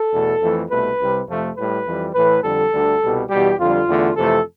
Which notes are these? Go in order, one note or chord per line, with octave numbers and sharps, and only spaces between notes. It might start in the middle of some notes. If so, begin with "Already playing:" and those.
Already playing: A4
E2 B2 A3
F2 E3 A3
C2 B2 A3 B4
C2 C3 G3
F2 C3 F3 A3
A2 G3 B4
F2 E3 G3
A2 E3 A3 B4
F2 D3 G3 A4
D2 D3 G3
C2 B2 G3
E2 B2 G3 G4
F2 D3 G3 F4
E2 D3 A3
F2 C3 E3 A3 A4